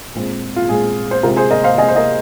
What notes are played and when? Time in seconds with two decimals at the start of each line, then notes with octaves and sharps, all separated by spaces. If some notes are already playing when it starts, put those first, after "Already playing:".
0.15 A#2 G#3 C4
0.56 F4
0.69 A#2 G#3 C4 G#4
1.11 C5
1.23 C3 G#3 C4 F4 A#4
1.36 G#4 C5
1.51 A#4 D#5
1.64 C5 F5
1.77 C3 G#3 C4 D#5 G#5
1.88 C5
1.96 A#4 D#5